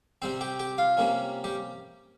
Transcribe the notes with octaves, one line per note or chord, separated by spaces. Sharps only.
C3 G3 C4 C5
G4 G5
G4 G5
F4 F5
C3 G3 A#3 C#4
G3 G4